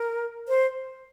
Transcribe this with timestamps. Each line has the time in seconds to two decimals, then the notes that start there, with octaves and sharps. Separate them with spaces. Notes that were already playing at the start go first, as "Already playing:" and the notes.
Already playing: A#4
0.48 C5